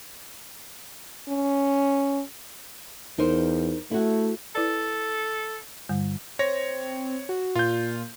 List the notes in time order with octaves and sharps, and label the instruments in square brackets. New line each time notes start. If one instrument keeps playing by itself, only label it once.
[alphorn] C#4
[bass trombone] E2 [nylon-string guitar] D#4 A#4 C5
[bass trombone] A3 [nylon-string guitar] E4 F#4
[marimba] E4 B4 D5 [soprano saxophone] A4
[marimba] G2 D3 G3
[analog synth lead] C4 [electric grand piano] C#5 A#6
[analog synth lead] F#4
[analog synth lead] A#2 [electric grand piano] F4 G6